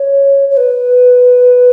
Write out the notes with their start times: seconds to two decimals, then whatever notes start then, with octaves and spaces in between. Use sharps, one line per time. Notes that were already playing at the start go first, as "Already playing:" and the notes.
Already playing: C#5
0.51 C#5
0.57 B4